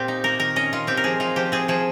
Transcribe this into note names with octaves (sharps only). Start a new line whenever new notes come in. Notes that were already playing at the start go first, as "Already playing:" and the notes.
Already playing: A#2 C4 F4 G4
D#4
A#3 A#4
D#3 A#4
C#4 D#5
D#3 F4
C4 G4
A#4
F3 G#4
D#4 F4
F3 G4
C4 G#4
F3 G#4